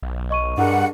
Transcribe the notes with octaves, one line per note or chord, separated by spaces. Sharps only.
B1
D#5 C#6 D#7
G2 D4 G#4 A#4 F#5